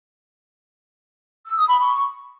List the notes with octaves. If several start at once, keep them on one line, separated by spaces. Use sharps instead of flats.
E6
D#6
B5
C#6